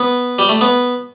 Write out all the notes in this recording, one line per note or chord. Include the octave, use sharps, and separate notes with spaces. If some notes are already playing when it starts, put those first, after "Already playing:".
Already playing: B3
G3
A3
B3